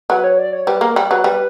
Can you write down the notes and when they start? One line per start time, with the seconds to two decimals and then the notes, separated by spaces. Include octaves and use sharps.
0.10 F#3 B4
0.24 C#5
0.38 D5
0.53 C#5
0.67 G3 B4
0.81 A#3 A#4
0.96 G3
1.11 F#3 B4
1.24 G3 B4